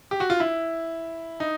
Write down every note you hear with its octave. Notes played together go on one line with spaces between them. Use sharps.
G4
F#4
F4
E4
D#4